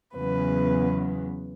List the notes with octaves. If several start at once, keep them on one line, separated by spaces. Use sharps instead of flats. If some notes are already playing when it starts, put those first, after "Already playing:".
E2 C#3 F#3 B3 B4